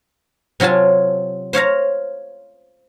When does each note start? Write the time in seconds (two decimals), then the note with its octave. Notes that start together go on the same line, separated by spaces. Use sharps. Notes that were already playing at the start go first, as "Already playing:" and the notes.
0.60 C3 F#3 F4 G#5 A5
1.53 C5 C#5 F5 A#5